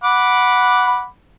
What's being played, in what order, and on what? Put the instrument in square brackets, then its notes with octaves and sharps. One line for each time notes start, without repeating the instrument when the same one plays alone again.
[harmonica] F#5 B5 D6